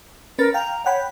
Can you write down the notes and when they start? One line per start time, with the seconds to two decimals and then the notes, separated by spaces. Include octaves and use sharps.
0.38 C#4 A#4 B4 A6
0.54 F5 G5 A#5
0.86 C#5 F#5 G5 B5